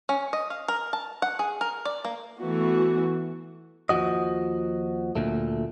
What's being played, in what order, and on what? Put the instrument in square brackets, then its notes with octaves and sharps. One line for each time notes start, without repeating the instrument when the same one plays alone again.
[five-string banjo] C#4
D#5
F5
A#4
A5
F#5
G#4
A#4
D5
A#3
[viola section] E3 A3 B3 F#4
[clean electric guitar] D#2 A#2 F3 F#4 D#5
D2 A#2 A3